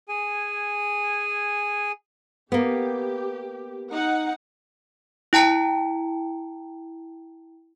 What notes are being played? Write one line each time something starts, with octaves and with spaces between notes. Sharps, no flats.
G#4 G#5
A#3 B3 G4
D#4 F#5
E4 G5 A5 A#5 C#7